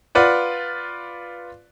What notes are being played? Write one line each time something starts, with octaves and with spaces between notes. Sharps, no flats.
F4 B4 D5 F#5